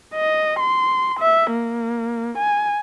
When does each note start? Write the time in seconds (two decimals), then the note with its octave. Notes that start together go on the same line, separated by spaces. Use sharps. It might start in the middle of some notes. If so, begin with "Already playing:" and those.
0.14 D#5
0.60 C6
1.20 E5
1.52 A#3
2.38 G#5